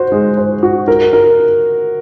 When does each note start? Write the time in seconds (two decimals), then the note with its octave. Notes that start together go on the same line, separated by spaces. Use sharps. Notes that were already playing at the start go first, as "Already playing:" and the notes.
Already playing: F#4 C5
0.12 G#3
0.37 C5
0.63 F#4
0.88 A#4
1.13 A#4